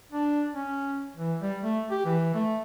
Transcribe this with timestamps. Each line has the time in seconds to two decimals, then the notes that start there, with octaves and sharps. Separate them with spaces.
0.12 D4
0.54 C#4
1.16 E3
1.42 G3
1.64 A3
1.91 G4
2.05 E3
2.35 A3